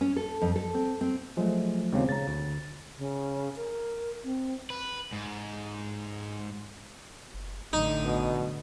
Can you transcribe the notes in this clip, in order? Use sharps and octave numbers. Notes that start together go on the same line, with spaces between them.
C#4
A4
F2
A4
C4
C4
F3 F#3 G#3 A3
D#2 C#3 F3 G#3 B3 C4
C#3 A#5 A6
D2
C#3
A#4
C4
B4
G#2
F#1
A1 A2 D3 D#4
B2